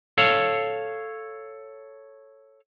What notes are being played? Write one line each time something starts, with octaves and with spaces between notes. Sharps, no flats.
A4 C#5 F5